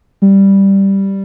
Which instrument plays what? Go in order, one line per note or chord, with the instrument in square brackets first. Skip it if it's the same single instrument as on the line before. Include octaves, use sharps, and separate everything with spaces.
[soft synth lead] G3